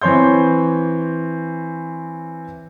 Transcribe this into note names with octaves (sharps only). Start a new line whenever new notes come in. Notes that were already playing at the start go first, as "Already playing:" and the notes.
E3 C4 C#5 C6 G6